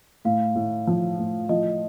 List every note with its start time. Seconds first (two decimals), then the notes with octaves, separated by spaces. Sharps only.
0.25 A2 F5
0.55 A2
0.87 F3
1.19 A2
1.49 F3 D#5